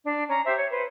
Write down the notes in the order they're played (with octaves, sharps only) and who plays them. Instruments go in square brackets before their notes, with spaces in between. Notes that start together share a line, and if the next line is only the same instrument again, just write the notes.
[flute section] D4
C#4 A#5
G4 C5 E5
C#5
B4 C5